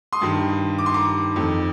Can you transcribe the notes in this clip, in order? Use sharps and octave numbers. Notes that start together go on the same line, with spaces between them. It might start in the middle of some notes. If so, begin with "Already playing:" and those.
C6 D#6
G2 D#3
D6
C6
A#5 D6
F2 D#3